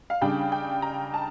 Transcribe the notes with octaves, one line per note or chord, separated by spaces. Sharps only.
F5
C#3 G3 D4 G5
G5
A#5
A5